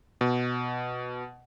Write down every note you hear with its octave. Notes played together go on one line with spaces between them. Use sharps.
B2